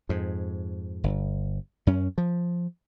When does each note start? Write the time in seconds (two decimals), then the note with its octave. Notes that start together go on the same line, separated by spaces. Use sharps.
0.09 F2 G#2
1.04 G1
1.87 F#2 C#4
2.18 F3